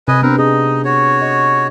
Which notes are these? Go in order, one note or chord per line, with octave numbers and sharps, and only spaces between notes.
C3 B4 D#5 G#5
B3 C4 D4 A#4 B4
D#4 G#4 D#5
F#4 C#5
D#5